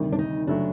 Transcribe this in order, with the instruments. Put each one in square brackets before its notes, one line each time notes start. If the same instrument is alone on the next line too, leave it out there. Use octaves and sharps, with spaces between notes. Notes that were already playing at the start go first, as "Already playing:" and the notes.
Already playing: [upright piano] D2 C3 D#3 G3
[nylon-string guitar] D4
D#4
[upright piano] F#1 F#3 A3 [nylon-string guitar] D4